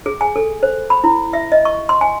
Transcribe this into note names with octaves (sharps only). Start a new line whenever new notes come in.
G#4
G#5
A4
C5
B5
E4
E5
D#5
C#6
C6
G#5